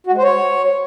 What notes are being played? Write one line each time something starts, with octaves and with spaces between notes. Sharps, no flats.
F#4
G#3
C5
C#5